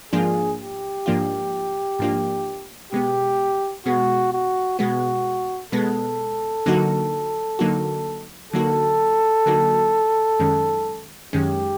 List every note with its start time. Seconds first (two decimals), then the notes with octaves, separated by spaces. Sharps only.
0.12 G#2 F3 A#3 D4 F4 G#4
0.59 G4
1.06 G#2 F3 A#3 D4 F4
1.99 G#2 F3 A#3 D4 F4
2.92 B2 G#3 B3 G4
3.86 B2 G#3 B3 F#4
4.33 F#4
4.79 B2 G#3 B3 F#4
5.72 B2 G#3 B3 A4
6.66 D3 F#3 A#3 D#4 F#4
7.59 D3 F#3 A#3 D#4 F#4
8.53 D3 F#3 A#3 D#4 F#4 A4
9.46 D3 F#3 A#3 D#4 F#4
10.40 F#2 D#3 G#3 C#4
11.33 F#2 D#3 G#3 C#4 G4